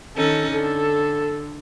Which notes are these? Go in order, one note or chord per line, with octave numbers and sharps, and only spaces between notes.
D#3 C#4 D#4 A4
D3 A4